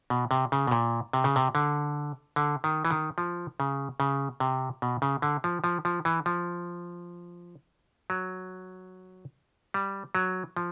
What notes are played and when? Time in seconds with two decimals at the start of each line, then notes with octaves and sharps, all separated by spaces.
0.10 B2
0.31 C3
0.52 C#3
0.67 B2
0.71 A#2
1.13 C3
1.24 C#3
1.36 C3
1.55 D3
2.36 D3
2.64 D#3
2.85 E3
2.91 D#3
3.18 F3
3.60 C#3
4.00 C#3
4.40 C3
4.82 B2
5.02 C#3
5.22 D3
5.44 F3
5.64 F3
5.85 F3
6.05 E3
6.26 F3
8.10 F#3
9.74 G3
10.15 F#3
10.56 F3